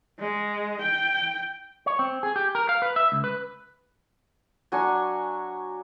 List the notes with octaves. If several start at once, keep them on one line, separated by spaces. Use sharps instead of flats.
G#3
G5
C#5
C4
G#4
G4
A#4
F5
B4
E5
C#2
B4
F#3 D4 G#5 C#6